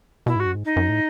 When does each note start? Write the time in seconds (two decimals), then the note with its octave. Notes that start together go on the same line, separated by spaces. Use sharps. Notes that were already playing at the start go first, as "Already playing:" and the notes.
0.26 B2 E4
0.36 G#2
0.40 F#4
0.46 F#2
0.55 G#2
0.65 D#4
0.76 F#2
0.89 A2